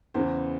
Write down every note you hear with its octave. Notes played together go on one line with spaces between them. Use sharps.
E2 C#3 E3 C5